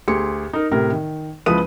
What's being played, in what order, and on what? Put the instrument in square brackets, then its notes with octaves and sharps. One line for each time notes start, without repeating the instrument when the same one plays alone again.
[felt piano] D2 G4 G#4 C6 C#7
D#4 A#4
A2 C3 A#4
D#3
C#2 F3 E4 B4 D#6 D#7